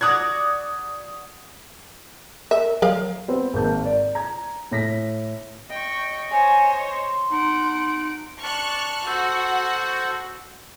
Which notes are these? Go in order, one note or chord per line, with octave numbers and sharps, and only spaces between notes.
F#4 D5 A#5 D#6 F#6 G#6
A#4 E5
F#3 A#4 D5 F5
B3 C4
G#1 G#2 D#3 A#3 A5 G6
D5
A#5 G#6
A2 A#6 B6
D#5 G5 C#6
C5 C#5 G#5
C6
D#4 F#5 D7
D4 A5 C#6 F6 F#6
F#4 A4 C5 F#5